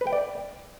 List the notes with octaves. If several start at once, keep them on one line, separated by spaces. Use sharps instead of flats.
B4
G5
D5